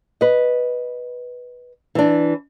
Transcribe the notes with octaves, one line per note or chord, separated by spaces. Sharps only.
B4 D#5
E3 D4